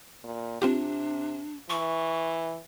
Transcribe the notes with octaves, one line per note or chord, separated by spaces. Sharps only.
A#2
C3 C4 D4 F4 G4
E3 C#6